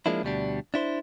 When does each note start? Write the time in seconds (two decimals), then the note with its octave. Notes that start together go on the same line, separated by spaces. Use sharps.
0.06 F3 G#3 A#3 D4 E4
0.23 D2 B2 G3 D4
0.74 D4 E4 C5